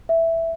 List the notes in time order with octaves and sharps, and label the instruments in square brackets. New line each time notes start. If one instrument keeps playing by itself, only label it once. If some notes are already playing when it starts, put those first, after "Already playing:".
[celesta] E5